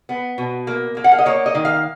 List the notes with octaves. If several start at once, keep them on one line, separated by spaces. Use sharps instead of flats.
B3
B2
A#3
A#3
F#5
F5
D#5
A#3 C#5
D#5
D#3
F5